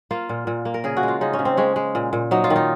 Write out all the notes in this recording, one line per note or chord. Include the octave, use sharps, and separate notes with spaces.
A#3 F4
A#2
A#2
A#3
A#4
C#3 G#4
F#4
G#3
F4
C#3 D#4
C#4
C#3
C4
G#3 C#4
G#3
A#2
A#2
F#3 D#4
F4
D#3
D#4